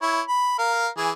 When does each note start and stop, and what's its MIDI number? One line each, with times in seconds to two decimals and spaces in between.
0.02 0.21 64
0.02 0.21 73
0.28 0.56 83
0.58 0.88 70
0.58 0.88 77
0.97 1.11 52
0.97 1.11 68